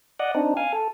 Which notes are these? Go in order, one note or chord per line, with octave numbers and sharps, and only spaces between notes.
D5 D#5 F#5
C4 D4 D#4
F5 G#5
A4